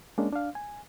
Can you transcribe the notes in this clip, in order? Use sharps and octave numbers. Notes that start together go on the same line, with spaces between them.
G#3 A#3 C#4 D4
D4 F5
G#5